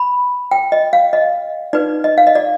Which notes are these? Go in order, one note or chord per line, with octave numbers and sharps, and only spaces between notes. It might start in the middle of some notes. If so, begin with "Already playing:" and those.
Already playing: B5
G5
D#5
F5
D#5
D#4 B4 D5
D#5
F5
D#5
D5